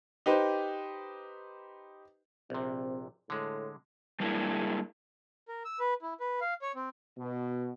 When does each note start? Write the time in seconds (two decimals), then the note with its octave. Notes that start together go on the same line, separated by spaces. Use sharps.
0.26 D#4 G4 B4 C5
2.50 A#1 C3 C4
3.30 A2 D3 G#3
4.20 G3 G#3 A#3 D4 E4 G#4
5.48 A#4
5.65 E6
5.79 B4
6.02 E4
6.20 B4
6.41 F5
6.62 C#5
6.75 C4
7.18 B2